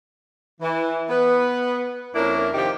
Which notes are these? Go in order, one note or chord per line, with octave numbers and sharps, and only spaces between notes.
E3
B3 B4
F2 A#3 C#4 D4 E4 A#4
C3 D#3 F3 D#4 G4